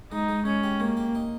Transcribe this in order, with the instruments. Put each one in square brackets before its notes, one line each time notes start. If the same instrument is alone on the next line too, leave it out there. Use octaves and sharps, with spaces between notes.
[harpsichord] G#3 [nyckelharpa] D#4
[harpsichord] G#3
[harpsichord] G#3 [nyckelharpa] C#4
[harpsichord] G4
[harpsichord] G#3 [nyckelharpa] A#3
[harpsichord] G4
D#4